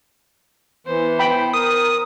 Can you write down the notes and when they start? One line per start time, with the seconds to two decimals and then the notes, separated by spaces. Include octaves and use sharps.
0.87 E3 B3 C5
1.19 G5 B5
1.54 A#4 D#6